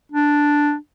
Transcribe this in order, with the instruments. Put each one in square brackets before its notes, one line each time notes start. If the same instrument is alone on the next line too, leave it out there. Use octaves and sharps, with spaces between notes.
[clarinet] D4